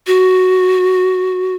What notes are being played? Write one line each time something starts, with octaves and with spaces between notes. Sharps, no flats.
F#4